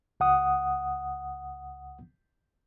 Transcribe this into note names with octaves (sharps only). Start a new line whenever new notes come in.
C#2 F#5 D#6